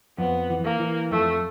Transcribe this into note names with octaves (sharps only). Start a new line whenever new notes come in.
F2 B3
E3
A#3
E3
F2 A3